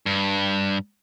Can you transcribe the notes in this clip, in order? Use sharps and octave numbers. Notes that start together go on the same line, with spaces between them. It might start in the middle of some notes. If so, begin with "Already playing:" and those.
G2